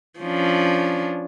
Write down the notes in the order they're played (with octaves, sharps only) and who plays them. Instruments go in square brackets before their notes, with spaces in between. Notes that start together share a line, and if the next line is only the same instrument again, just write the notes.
[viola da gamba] F3 C#4 D4